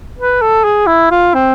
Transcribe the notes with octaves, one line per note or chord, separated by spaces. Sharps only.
B4
A4
G#4
E4
F4
C4